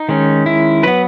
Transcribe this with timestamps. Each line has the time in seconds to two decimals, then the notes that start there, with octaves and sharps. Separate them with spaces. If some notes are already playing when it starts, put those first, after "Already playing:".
Already playing: D#4
0.09 D#3 G#3 C#4
0.46 E4
0.83 F#3 B3 B4